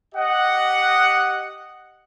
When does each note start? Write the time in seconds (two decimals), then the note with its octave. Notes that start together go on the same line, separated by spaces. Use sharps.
0.15 G4 D#5 F#5